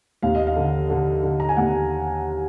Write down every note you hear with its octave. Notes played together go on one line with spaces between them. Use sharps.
D#2 F5
D#5
F5
D3
D3
D3
A#5
G#5
D#2 F#5